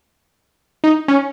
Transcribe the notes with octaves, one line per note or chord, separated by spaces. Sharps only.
D#4
C#4